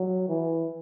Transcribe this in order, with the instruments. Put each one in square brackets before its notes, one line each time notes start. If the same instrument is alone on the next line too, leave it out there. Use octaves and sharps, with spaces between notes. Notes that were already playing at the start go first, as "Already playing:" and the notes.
Already playing: [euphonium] F#3
E3